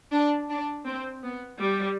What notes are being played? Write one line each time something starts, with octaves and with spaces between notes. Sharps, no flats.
D4
D4
C4
B3
G3